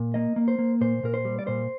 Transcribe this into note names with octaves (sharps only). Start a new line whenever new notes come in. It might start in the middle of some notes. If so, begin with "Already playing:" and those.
Already playing: A#2
A#3 D#5
A#3
C5
A#3
A#2 C5
A#2 A#4
C5
G3
D5
A#2 C5